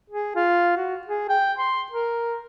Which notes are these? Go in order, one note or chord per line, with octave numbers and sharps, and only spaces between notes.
G#4
F4
F#4
G#4
G5
C6
A#4